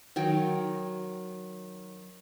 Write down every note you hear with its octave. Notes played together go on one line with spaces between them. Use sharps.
D#3 F#3 G5